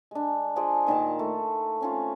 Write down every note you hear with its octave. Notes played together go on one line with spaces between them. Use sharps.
G#3 D4
F3 G#4 D5 C6
A#2 D#3 A#4 A5
A3
C4 C#4 F4